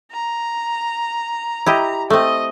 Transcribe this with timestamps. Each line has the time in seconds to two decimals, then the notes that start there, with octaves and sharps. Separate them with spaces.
0.12 A#5
1.66 E4 G4 D#5
2.10 A3 C4 D#5